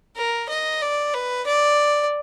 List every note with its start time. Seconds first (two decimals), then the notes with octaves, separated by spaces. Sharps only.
0.17 A#4
0.49 D#5
0.82 D5
1.14 B4
1.46 D5